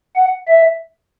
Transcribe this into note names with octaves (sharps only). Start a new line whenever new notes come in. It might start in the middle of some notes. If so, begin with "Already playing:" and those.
F#5
E5